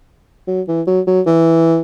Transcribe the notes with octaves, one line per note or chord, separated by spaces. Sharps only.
F#3
E3
F#3
F#3
E3